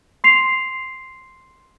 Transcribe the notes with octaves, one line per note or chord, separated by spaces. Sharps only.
C6 C7 F7